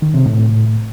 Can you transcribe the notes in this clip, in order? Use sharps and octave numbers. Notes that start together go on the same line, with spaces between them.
D#3
C3
A2